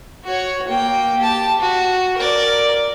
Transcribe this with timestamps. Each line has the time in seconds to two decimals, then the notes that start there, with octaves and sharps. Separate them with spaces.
0.24 F#4 C#5
0.68 A#3 G5
1.17 G4 A5
1.59 F#4
2.17 A#4 D5